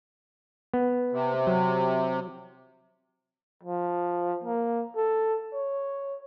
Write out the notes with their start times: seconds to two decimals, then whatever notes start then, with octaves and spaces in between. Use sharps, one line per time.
0.74 B3
1.12 C3
1.47 F#3
3.63 F3
4.44 A#3
4.96 A4
5.53 C#5